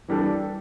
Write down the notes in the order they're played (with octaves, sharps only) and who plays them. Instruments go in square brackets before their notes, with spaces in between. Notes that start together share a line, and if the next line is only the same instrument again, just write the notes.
[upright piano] E3 G3 D4 A4